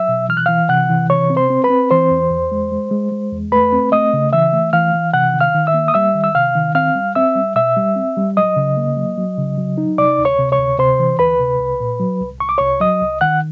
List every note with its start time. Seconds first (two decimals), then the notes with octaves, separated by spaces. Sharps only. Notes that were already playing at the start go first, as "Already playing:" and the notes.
Already playing: F#3 E5 E6
0.08 B2
0.29 E3 F6
0.37 F#6
0.46 E3 F5 F6
0.69 C3 F#5 F#6
0.90 E3
1.09 C3 C#5 C#6
1.30 C4
1.37 C5 C6
1.50 C4
1.64 B4 B5
1.70 C4
1.91 E3 C5 C6
2.11 E2
2.31 E2
2.52 G#3
2.72 G#3
2.91 G#3
3.12 G#3
3.32 E2
3.52 A3 B4 B5
3.72 C4
3.92 A3 D#5 D#6
4.13 C#3
4.33 E3 E5 E6
4.53 A3
4.73 E3 F5 F6
4.94 E3
5.13 C3 F#5 F#6
5.34 D#3
5.41 F5 F6
5.55 D#3
5.67 E5 E6
5.74 A#3
5.88 D#6
5.94 G3 E5 E6
6.15 D#3
6.24 E6
6.35 C3 F5 F6
6.55 D#3
6.75 C4 F5 F6
6.95 G3
7.15 C4 E5 E6
7.36 G3
7.55 B2 E5 E6
7.77 G3
7.96 C4
8.17 G3
8.37 F#3 D#5 D#6
8.56 C#3
8.77 A#3
8.97 F#3
9.18 F#3
9.38 C#3
9.58 F#3
9.78 D#4
9.98 C3 D5 D6
10.19 D2
10.25 C#5 C#6
10.39 C3
10.52 C#5 C#6
10.59 D2
10.79 C3 C5 C6
10.99 E3
11.19 D2 B4 B5
11.39 C3
11.60 C2
11.80 A#2
12.00 F#3
12.21 C2
12.40 C2 C#6
12.49 D6
12.58 C2 C#5 C#6
12.80 F#3 D#5 D#6
13.01 C2
13.21 D#3 F#5 F#6